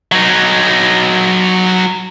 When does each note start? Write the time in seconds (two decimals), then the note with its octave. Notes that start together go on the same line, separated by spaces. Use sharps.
0.12 F#3 D#4